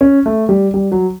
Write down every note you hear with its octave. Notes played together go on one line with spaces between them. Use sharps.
C#4
A3
G3
G3
F#3